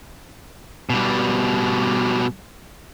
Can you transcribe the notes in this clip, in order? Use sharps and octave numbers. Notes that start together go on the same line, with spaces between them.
B2 G3